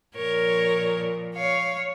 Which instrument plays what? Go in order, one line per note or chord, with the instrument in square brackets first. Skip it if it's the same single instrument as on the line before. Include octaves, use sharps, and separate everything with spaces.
[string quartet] A#2 F3 A#4 C#5
C#5 F5